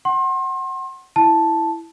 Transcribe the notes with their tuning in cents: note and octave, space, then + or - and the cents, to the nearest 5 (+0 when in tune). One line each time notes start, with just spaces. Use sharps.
F#5 +20 C6 +35
E4 +0 A5 +0